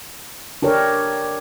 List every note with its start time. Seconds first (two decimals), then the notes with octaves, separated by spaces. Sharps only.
0.62 D4 G4 A#4 C#5